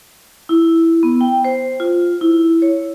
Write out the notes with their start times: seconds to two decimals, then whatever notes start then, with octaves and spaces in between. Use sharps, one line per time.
0.49 E4
1.03 B3
1.21 G5
1.45 C5
1.80 F4
2.21 E4
2.62 C#5